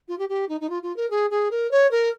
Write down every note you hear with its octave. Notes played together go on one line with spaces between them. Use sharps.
F4
G4
G4
D#4
D#4
F4
F4
A#4
G#4
G#4
A#4
C#5
A#4